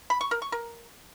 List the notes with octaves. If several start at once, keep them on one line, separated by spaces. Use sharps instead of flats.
B5
C#6
A#4
C#6
A#4